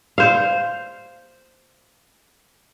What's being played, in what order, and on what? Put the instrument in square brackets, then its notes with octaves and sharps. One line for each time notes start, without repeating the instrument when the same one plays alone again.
[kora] C5 F5